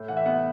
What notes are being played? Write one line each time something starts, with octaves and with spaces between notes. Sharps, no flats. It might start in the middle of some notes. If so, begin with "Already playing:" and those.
Already playing: A2
E3 F#5
E5
B3 F#5